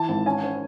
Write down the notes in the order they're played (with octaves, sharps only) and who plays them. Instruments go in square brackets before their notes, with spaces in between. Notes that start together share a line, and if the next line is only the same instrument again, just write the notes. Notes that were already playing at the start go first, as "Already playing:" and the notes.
Already playing: [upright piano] E3 A5
G#1
C#4 G#5
C#4